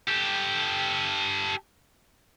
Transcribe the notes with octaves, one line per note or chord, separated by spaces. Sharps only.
G4 A4